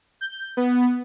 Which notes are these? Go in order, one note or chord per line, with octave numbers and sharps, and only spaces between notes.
G6
B3